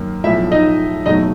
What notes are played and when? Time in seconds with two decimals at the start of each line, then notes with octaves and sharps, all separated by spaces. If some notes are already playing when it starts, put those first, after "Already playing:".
Already playing: F#2 D#3 A#3
0.24 B1 A2 F3 A3 E4 E5
0.51 D#4 D#5
1.06 F#1 E2 B2 F#3 A3 D#4 D#5